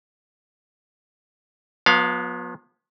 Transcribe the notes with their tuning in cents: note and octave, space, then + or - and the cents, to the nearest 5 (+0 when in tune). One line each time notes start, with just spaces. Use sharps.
F3 +45 B3 -25 F5 +0